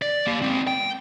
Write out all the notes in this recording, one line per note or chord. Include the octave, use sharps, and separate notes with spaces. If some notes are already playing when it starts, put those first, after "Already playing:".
D5
A#3 G4
G#3 C4
G5